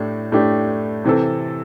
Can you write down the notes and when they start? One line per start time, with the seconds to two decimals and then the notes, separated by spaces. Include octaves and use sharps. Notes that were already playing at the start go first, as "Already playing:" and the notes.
Already playing: A2 A3 D4 G4
0.32 A2 A3 D4 G4
1.05 C3 E3 C4 A4